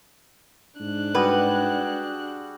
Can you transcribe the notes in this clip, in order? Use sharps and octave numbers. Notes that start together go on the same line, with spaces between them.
G#2 D4 F#6
G3 F#4 G#4 B4